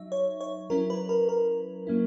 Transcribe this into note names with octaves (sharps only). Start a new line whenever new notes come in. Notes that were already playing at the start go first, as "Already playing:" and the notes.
Already playing: F#3 D#4 E5
C#5
C#5
F#3 C#4 E4 A#4
B4
A#4
A#4
F#3 A#3 C#4 E4